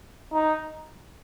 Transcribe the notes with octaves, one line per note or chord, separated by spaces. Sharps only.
D#4